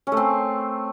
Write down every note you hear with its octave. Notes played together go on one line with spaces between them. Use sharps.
C#4
A3
C4